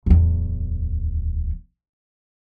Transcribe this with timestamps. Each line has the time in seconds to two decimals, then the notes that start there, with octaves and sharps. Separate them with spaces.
0.06 D1 E2